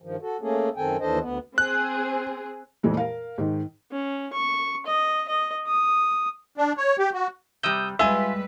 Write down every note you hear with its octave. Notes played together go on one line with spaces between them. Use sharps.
G2 D#3 F3
F#4 A4
A3 A#3 C#4 G#4 A4
F#2 D#3 C4 A4 G5 G#5
D#2 E3 D4 A4 C5 D#5
D2 B3
C4 G#4 F#6
F2 A#2 E3 G#3 A3
A#4 F5
G#2 D#3
C#4
C#6
D#5
D#5
D#6
D4
C#5
G4
F#4
C3 G3 D#6 E6 G6
G3 G#3 F4 B4 E5 G#5 E6